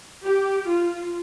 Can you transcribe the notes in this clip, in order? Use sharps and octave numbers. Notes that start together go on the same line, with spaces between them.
G4
F4